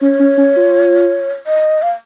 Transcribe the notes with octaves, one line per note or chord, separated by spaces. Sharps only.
C#4 C#5
C#4
C#4
F4
D#5
F5